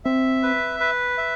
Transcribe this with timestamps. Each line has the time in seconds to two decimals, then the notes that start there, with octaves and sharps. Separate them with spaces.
0.05 C4 E5
0.43 B4
0.80 B4
1.18 E5